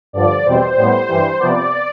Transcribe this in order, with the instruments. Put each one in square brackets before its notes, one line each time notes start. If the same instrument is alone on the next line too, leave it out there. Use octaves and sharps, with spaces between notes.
[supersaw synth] G2 D3 F3 D5
E2 B2 G3 C4 C5
A2 G3 B3
G2 E3 G3
C3 F3 B3 D5